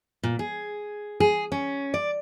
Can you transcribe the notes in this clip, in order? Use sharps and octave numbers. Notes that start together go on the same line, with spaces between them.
A#2
G#4
G#4
C#4
D5